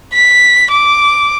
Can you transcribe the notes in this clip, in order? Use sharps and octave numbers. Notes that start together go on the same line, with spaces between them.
B6
D6